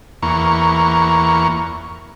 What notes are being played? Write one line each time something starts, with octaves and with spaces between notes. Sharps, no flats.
E2 A#3 C#6